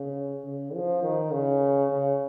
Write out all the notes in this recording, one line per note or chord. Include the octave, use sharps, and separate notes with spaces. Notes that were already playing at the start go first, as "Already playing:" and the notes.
Already playing: C#3
C#3
F3
D#3
C#3
C#3